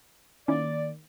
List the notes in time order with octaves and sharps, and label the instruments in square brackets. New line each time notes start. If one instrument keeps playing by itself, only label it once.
[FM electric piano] D#3 A#3 [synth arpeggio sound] C#4 D#4 E4 [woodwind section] D5